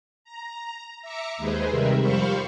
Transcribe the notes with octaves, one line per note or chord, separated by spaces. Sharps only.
A#5
E5 A#5 D6 C#7
D#2 G#3 G#4 B4 C5
C3 D#3 G3 A#4 E5
F2 G3 C5 F5 B5 C#6